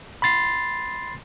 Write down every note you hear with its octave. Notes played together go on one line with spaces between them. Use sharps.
B5 C6 A6 C7